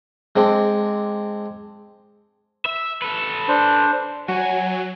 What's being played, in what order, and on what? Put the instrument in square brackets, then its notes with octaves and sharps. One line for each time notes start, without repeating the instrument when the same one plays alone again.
[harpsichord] G#3 C4 D4
[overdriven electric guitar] E5
A4 B4
[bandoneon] D4 C5
[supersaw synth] F#3 [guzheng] F#4 [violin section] G#5